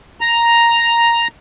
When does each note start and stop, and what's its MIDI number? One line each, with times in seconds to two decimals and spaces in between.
0.21 1.28 82